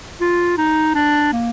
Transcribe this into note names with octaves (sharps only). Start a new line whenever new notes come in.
F4
D#4
D4
A#3